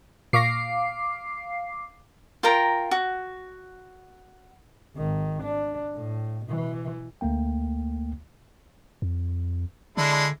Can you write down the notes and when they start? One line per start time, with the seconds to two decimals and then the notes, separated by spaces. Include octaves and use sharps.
0.33 A#2 F5 C#6 D6 A#6 C7
2.43 F4 A#4 G5 A#5
2.91 F#4
4.96 G#1 D#3
5.42 D4
5.96 A2
6.45 B2 E3
7.21 D2 A3 A#3 G5
9.02 F2
9.97 D3 G#3 D4 E4